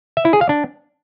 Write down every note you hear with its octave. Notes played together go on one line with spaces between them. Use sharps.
E5
E4
G#4
F5
D4